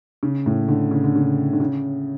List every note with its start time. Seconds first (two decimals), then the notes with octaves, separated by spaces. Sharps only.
0.23 C#3
0.46 A2
0.68 D3
0.91 C#3
1.04 D3
1.16 C#3
1.53 D3
1.60 C#3